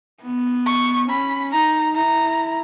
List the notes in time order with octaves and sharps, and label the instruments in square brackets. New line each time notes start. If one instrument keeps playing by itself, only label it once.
[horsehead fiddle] B3
[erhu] C#6
[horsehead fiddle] C#4 [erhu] B5
[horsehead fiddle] D#4 [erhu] A#5
[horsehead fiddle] E4 [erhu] A#5